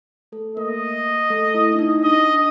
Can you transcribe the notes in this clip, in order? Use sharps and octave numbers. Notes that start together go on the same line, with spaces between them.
A3 A4
A#3 A#4 D#5
A3 A4
E4
D4
D#4
D4 D#5